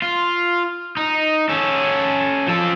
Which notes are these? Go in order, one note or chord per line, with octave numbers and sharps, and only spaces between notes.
F4
D#4
C#4 A4
F3 A4